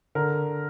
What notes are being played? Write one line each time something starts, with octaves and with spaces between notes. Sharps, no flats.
D3 A#4